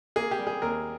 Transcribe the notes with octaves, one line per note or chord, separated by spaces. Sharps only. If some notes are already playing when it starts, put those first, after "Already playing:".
A#3 G#4
G4
G3
G#4
D#2 A#4